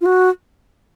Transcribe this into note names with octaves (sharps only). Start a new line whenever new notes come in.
F4
F#4